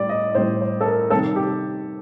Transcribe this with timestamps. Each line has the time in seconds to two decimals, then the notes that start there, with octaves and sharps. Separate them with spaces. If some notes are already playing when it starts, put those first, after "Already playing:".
Already playing: A2 G3 D5
0.09 D#5
0.35 A2 G3 C5
0.61 C5
0.81 A4
0.85 A#4
1.10 C3 D#3 G3 A4
1.36 G4